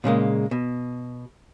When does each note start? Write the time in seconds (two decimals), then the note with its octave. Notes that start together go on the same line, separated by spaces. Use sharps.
0.04 A#2 C#3 G#3 A#3
0.51 B2